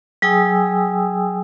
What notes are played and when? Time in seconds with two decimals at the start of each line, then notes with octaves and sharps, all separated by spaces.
0.22 F#3 G#4 G5 G#5 D#6 E6